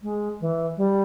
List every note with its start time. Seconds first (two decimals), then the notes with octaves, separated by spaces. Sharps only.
0.02 G#3
0.40 E3
0.77 G3